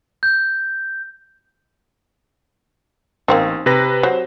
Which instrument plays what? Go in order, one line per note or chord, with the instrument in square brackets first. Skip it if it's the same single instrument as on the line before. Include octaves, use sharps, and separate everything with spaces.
[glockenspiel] G6
[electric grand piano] A1 [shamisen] A#3 C4 D#4
[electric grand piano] C3 B4 A#6
[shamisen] F#3 [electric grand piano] C5